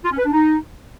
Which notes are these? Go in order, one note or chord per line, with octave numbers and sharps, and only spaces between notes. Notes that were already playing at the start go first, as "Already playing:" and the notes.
F4
C#4
B4
D4
D#4